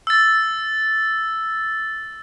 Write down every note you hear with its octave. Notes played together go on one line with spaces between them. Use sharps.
E6 A6